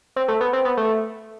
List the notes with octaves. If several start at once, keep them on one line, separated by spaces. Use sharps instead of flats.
C4
A3
B3
C4
B3
A3